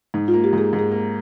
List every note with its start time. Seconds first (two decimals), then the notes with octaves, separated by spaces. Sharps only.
0.14 G#2 D#4
0.28 F4
0.34 A#3
0.44 G4
0.53 G#2 G#4
0.73 G#2
0.79 G#4
0.92 A#3